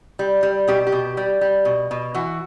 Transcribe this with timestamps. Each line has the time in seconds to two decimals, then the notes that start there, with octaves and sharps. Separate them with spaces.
0.19 G3
0.43 G3
0.68 B2 G4
0.87 G4
0.92 B2
1.17 G3
1.41 G3
1.65 B2
1.91 B2
2.15 E3 F#4